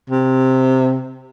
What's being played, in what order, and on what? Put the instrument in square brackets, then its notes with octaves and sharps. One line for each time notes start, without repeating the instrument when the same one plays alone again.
[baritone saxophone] C3